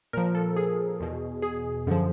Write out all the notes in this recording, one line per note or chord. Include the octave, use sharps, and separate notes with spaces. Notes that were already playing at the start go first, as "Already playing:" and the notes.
A#2 F3 A#4
A4
G#4
E2 B2
G#4
F#2 D3 F3